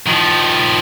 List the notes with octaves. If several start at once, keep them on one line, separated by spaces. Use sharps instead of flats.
D#3 F3